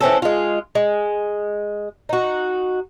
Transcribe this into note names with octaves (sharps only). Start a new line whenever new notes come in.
E3 C4 C#4 A4
G#3 F4
G#3
D#4 F#4